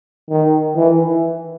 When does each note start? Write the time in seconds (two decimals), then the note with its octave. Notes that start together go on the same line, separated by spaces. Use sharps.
0.30 D#3
0.76 E3